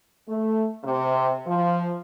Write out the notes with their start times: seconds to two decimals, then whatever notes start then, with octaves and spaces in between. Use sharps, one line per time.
0.27 A3
0.83 C3
1.45 F3